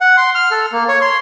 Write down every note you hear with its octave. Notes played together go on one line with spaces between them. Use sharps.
F#5
C6
F6
A4
A#3
C#5
C6